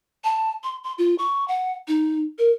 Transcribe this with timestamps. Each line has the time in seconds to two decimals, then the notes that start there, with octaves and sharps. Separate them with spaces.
0.24 A5
0.63 C6
0.84 C6
0.98 F4
1.18 C#6
1.48 F#5
1.88 D#4
2.38 A#4